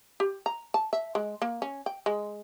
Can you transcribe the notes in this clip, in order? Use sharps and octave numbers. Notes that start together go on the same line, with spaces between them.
G4
A#5
A5
E5
G#3
A#3
C#4
G5
G#3